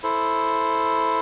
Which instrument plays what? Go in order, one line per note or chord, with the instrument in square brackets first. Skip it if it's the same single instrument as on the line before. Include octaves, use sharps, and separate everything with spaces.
[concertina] E4 A4 C5